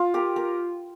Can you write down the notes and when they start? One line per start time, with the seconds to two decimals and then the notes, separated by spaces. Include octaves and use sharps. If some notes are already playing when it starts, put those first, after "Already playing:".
Already playing: F4
0.14 G4 A#4
0.36 A#4